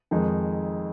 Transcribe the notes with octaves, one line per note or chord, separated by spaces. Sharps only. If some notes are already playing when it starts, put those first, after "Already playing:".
F2 D#3 G#3 D#4